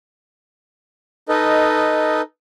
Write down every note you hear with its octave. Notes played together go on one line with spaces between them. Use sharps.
D#4 A4 B4 D#5